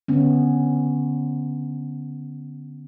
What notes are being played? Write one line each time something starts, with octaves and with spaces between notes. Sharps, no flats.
D3 B3 C#4